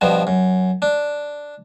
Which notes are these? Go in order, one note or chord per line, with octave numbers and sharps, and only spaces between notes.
G2 B2 F3 B3
F#2
D4